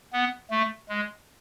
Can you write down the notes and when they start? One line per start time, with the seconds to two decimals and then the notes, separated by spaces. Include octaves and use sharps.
0.13 B3
0.51 A3
0.89 G#3